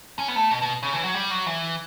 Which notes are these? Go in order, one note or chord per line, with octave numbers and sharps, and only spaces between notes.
C#4
B3
A3
B2
B2
C#3
E3
F#3
G3
F#3
E3